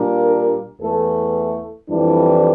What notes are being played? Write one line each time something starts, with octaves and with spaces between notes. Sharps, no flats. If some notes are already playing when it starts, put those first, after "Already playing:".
Already playing: A#2 G3 A#3 D4
A#4
E2 E3 A3 A4
F2 E3 G3 D4 E4